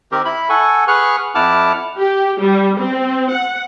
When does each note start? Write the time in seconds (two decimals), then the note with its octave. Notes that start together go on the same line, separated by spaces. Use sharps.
0.12 D#3 C4 G4 A#4
0.25 E4 B5
0.49 A4 F#5 G#5 C#6
0.88 G#4 B4 F#5 C#6 F6 F#6
1.35 F2 E4 F#5 A5 D6 F6
1.98 G4
2.41 G3
2.80 C4
3.32 F#5